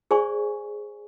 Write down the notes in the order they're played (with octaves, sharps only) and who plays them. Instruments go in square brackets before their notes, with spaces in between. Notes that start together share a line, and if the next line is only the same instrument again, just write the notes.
[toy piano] G#4 C5 D5 G#5 C#6